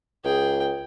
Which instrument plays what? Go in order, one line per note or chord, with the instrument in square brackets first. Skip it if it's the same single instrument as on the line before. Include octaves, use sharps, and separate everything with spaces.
[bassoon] C#2 [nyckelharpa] G#4 G5